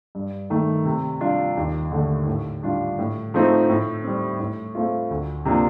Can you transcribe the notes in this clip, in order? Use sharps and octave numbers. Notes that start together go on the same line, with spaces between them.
G2
D#3 A3
C3
G3 D4 F4
D#2
D3 A3
A2
G3 D4 F4
A2
F3 A3 C4 D#4
A2
G3 C4
A2
A3 C4 F4
D2
C3 F3 A#3 D4